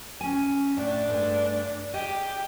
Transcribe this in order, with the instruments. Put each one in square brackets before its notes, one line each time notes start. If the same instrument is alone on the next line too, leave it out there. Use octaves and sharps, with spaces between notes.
[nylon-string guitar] C#4 G#5
[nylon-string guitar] A2 [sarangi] D4
[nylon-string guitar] G2 G#3 A3
[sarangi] G4 [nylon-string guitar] G#4 D#5